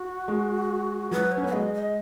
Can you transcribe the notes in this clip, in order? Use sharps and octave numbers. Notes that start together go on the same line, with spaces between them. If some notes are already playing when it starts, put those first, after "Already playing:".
Already playing: F#4
G#3
F#3 B4
C#5
C#4
B3 F#5
G#3 D#5
D#5